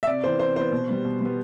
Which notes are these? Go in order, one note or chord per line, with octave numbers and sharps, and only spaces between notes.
E5
C3 D5
E3 B3 C5
C3 C5
E3 B3 C5
B2
G3 B3
B2
G3 B3